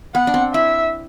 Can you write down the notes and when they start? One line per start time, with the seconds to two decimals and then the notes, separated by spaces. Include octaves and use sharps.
0.15 B3 F#5
0.27 D4
0.34 C4
0.54 E4 E5